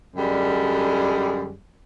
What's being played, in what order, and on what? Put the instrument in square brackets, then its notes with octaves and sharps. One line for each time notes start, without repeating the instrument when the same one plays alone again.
[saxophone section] F#2 D3 G3 G#3